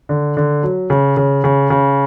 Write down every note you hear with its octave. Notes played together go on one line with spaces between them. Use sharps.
D3
D3
F#3
C#3
C#3
C#3
C#3